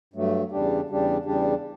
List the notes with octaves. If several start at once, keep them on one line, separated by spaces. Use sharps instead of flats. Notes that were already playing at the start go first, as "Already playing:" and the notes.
G2 F#3 A3
E2 C#3 G3 D4 G4
E2 C#3 G3 D4 G4
E2 C#3 G3 D4 G4